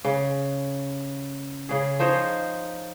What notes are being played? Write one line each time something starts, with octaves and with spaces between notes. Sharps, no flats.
C#3
C#3 G#4
F3 D#4 C5 C#5